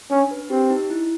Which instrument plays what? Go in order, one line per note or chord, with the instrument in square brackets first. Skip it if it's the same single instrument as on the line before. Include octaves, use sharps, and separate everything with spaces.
[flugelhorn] C#4 [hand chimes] D4
[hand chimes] B4
[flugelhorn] C4 [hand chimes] G4
[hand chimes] D#4
E4